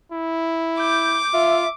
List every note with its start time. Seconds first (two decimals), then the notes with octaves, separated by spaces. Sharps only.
0.12 E4
0.79 D6 G6
1.33 F4 E5